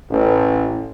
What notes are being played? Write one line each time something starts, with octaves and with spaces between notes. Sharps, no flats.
A1